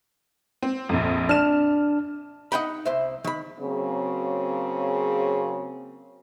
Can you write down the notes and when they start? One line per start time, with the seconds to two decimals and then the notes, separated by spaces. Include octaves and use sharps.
0.62 C4
0.89 A#1 F2
1.29 D4 F6 E7
2.52 D#4 F#5 G5 B5
2.86 C2 C5 E5
3.24 D#3 B5
3.60 C#3 F#3 A#3 C4 G#4